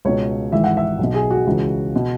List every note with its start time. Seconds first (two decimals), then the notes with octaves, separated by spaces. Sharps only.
0.05 C#2 B2 C#5
0.52 G#1 G#2 E3 E5
0.64 F#5
0.77 E5
0.99 B1 B2
1.14 G#4
1.30 F#4
1.47 C#2 C#3 E3
1.96 B2